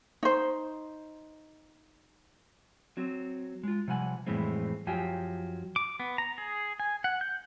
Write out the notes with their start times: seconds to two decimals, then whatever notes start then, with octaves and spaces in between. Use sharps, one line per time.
0.23 D#4 C5
2.97 F#3 C4
3.63 G#3 F4
3.88 C3 F3 G3 F#5 G#5
4.26 F2 A2 E3 G3 G#3 C4
4.87 F#2 F3 F#3 G4 G5 G#5
5.76 D6
6.00 B3
6.18 A#5
6.38 G#4
6.80 G#5
7.04 F#5
7.21 G6